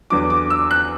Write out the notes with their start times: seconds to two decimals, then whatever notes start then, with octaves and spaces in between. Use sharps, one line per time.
0.10 E2 D3 F#3 D6
0.30 D6
0.50 E6
0.71 F#6